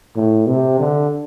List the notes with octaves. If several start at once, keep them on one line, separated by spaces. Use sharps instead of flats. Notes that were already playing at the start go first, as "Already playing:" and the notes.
A2
C3
D3